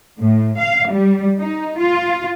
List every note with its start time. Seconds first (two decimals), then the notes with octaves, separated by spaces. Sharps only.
0.20 A2
0.59 F5
0.91 G3
1.40 D#4
1.78 F4